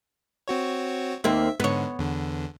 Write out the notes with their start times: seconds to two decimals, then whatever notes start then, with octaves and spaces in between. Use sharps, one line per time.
0.48 C4 F#4 C#5
1.24 D#2 A#3 C4 E5
1.60 G#2 D3 B3 C#5
1.99 E2 D3